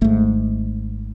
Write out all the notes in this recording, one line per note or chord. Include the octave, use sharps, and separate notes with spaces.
G#1 G#2 A3